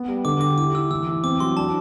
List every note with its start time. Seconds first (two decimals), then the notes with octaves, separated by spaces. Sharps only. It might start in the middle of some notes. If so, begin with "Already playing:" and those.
Already playing: B3
0.08 G3
0.25 D3 D6
0.41 G4 D6
0.58 E4 D6
0.74 E4 E6
0.91 E3 E6
1.08 E3
1.23 C4 D6
1.40 F#3 C6
1.56 D4 A5